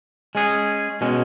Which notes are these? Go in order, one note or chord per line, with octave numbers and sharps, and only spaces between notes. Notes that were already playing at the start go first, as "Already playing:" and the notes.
G#3 C#4 G#4
B2 G#3 C#4